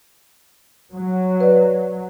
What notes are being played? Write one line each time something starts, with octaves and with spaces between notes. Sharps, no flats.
F#3
B4 D5